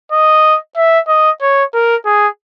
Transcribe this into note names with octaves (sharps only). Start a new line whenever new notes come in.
D#5
E5
D#5
C#5
A#4
G#4